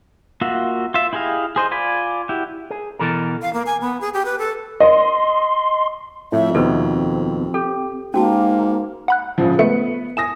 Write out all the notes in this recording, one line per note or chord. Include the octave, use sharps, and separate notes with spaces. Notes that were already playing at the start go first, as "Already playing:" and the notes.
A#3 F4 F#4 E5
F4 E5
E4 G4 G#4 D#5 F5
G#4 C5 D#5
F4 D5 G#5 B5
E4 F#4 G4
G#4
B2 E3 A4 A#4
F5
A#3
G#5
B3
G#4
G4
B4
A4
D#5 C6
F2 A2 E5
D#2 B2 C4 A4 B4 C5
G4 A4
G#2 A#3 C#4 F#4 A5
F#5 B5 F#6
A#1 C#3 F3
G#3 A3 B3 A4 B4 C#7
G#5 D#6 A#6 E7